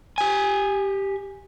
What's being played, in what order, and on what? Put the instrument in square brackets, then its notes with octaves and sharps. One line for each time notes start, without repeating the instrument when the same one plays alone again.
[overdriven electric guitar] G4 G#5